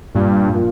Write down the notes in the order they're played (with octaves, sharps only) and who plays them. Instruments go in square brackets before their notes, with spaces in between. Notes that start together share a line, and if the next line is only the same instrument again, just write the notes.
[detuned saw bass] G2 [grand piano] A#2
[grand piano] F3 A#3 F4